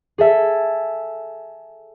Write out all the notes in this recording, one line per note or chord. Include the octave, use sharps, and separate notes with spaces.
G#4 A4 E5